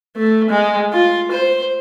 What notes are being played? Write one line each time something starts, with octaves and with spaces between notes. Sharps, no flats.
A3
G#3
F4
C5